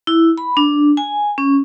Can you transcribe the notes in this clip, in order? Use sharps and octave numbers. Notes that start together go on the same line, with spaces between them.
E4
B5
D4
G#5
C#4